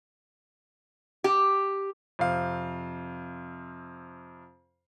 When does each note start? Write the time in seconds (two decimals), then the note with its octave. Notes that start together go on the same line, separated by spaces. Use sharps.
1.24 G4
2.19 F2 C3 F5